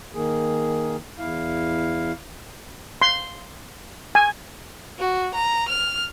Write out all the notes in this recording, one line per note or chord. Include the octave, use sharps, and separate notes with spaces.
D#3 A#3 G#4
E2 E4 F5
C6
G#5
F#4
A#5
F6